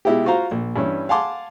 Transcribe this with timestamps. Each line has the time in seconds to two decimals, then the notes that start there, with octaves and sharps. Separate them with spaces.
0.05 B2 G#3 E4 F4 G4
0.25 F4 F#4 C5 F5 A#5
0.51 A#1
0.76 G2 E3 C#4
1.09 F5 F#5 G#5 A5 C6 D6